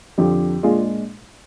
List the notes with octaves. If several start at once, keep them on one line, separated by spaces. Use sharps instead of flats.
F2 D3 F3 G4
A#2 G#3 D4 F4 G#4